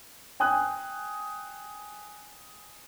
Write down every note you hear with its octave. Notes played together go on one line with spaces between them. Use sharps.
G5 G#5 D#6 F#6